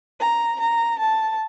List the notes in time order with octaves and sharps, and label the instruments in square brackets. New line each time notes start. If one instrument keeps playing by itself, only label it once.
[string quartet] A#5
A#5
A5